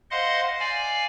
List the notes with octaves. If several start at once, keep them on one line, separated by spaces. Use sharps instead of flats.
C5 D#5 F5 F#5 C6
D5 F5 G#5